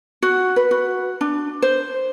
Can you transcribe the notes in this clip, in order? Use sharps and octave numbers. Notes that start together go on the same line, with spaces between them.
F#4
B4
F#4
D4
C5